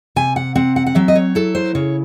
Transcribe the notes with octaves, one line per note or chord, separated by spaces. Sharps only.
C3 G#5
F#5
C4 F#5
F#5
F#5
F#3 E5
D#5
C#5
E4 A4
C5
C#3 C#5